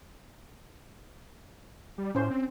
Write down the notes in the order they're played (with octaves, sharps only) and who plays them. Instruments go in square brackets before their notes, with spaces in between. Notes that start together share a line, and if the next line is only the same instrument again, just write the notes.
[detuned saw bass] G3
[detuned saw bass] A2 [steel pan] C#4 C5
[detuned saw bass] C4